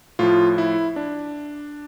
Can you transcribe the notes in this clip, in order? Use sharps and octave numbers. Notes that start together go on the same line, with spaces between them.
A2 F3 F4
E4
D4